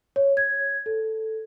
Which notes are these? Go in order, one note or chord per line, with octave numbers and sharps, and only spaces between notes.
C#5
G#6
A4